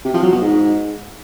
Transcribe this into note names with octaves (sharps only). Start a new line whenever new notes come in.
C3
F3
F#3
B2
G#2